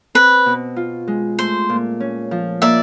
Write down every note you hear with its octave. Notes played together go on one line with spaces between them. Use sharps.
C4 B4
B2
F4
G#3
A3 C5
A#2
C#4
F3
A#3 D5 E5